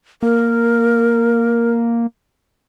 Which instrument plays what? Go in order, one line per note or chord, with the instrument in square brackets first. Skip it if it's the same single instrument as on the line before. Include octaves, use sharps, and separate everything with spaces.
[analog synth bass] A#3 [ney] A#4